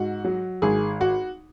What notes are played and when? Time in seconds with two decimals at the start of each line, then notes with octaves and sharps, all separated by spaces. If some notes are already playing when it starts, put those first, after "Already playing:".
Already playing: G#2 F#4
0.24 F#3
0.62 G#1 G#4
1.01 F#4